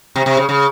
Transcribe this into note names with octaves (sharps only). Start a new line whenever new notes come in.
C3
C3
C#3
C#3